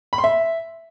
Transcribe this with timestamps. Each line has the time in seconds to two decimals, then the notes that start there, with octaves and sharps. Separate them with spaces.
0.13 B5
0.18 C6
0.24 E5